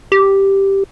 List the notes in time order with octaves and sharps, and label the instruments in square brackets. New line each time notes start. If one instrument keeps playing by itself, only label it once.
[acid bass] G4